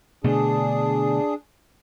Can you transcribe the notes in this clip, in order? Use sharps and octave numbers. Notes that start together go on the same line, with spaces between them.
B2 D3 A3 D4 G#4